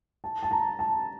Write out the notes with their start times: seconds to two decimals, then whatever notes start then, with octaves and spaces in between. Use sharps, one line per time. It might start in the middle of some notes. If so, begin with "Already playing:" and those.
0.24 A5
0.43 A5
0.51 A#5
0.79 A5